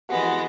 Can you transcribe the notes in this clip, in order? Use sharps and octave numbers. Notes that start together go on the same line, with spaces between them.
E3 G#3 B3 F#4
F#4